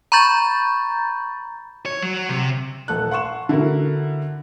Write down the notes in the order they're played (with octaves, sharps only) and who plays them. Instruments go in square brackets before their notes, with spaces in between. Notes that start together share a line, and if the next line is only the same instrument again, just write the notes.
[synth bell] A#5 B5 C#6 G6 A6
[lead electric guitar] C#5
F#3
C3
[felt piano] D#1 A4 F#6
F#5 C6 C#6 E7
D3 E4 F#4 A#4